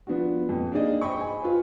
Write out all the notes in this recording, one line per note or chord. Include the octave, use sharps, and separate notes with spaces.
F3 B3 D4 F#4
F2 A#2
A#3 D4 D#4 G#4 D5 D#5
C5 D#5 G5 B5 C#6
G#5
F4 B4 C5